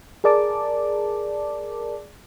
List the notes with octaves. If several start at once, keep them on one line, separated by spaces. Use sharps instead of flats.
G#4 A#4 D5 A5 D6